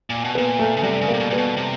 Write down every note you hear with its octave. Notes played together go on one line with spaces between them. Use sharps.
A#2
B2
A#2 B3
A3
C#3
C3 G3
C#3
A#3
C3
B2
A#2 B3
B2
C3